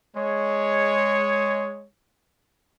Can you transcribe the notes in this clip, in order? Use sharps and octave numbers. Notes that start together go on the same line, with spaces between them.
G#3 C#5